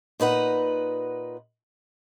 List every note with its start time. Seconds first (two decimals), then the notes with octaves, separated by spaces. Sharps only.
0.20 A#2 D#4 B4 F#5